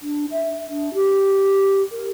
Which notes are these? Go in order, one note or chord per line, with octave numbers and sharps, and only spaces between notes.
D4
E5
D4
G4
A#4